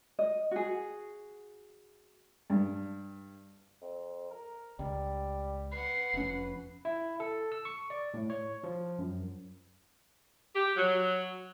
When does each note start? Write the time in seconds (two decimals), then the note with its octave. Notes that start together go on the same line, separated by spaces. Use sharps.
0.19 D#5
0.51 F#4 G#4
2.50 G2
3.82 F2
4.31 A#4
4.79 C#2 G3
5.72 B4 F#5 C7
6.14 F1 F2 C#4
6.85 E4
7.20 A4
7.52 E6
7.65 C#6
7.90 D5
8.14 A2
8.30 C#5
8.64 F3
8.99 F#2
10.55 G4
10.77 F#3